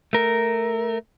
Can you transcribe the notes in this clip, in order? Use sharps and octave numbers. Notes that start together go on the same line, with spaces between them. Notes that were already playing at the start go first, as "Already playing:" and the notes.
A3 A#4